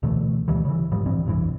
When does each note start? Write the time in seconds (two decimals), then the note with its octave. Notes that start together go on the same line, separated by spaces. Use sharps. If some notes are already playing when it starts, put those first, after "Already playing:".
0.03 D2 B2 E3 A3
0.48 D2 D#3 E3 G3
0.65 C#3 E3
0.91 G#2 F3 G3
1.06 D1 G2 E3 C4
1.25 F1 B1 G2 E3